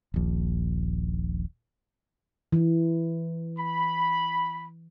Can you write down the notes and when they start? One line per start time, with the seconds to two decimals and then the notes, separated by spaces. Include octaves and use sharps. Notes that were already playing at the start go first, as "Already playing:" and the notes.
0.14 D#1 A#1
2.52 E3
3.58 B5